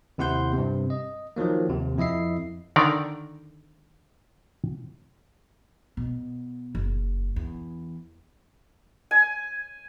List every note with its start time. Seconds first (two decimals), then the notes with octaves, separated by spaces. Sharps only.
0.18 D#2 C3 E4 F#5 C6 G6
0.54 G2 C3
0.90 D#5
1.36 D#3 F3 F#3 A#3
1.69 D#2 C3
1.97 F2 E4 D#5 E5 C7
2.76 D3 D#3 A#4 D5
5.97 B2
6.75 F#1
7.36 E2
9.11 G#5